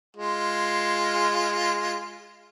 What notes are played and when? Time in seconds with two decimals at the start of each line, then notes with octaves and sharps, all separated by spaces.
0.17 G#3 F4